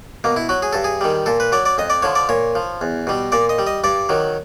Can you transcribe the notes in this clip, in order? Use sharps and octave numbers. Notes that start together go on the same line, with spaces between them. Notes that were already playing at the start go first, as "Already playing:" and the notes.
B2 A#3
E4
F#3 F#4
G#4
G2 A4
G#4
D#3 G3
A#2 A4
B4
F#3 D5
D5
F2 D#5
D5
D3 F3 C#5
D5
A#2 C#5
F3
E2
B2 G3
A#2 D5
D#5
G3
D#5
G2 D5
D#3 F#3